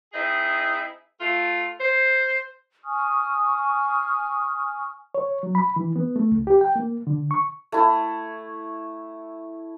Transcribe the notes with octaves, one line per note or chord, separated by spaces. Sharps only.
C4 D#4 E4 G#4
A3 F4
C5
G#5 C#6 D#6 F6
C#5
F#3
B5
E3
B3
A3
C#2
G4
G5
A#3
D3
C#6
A3 E4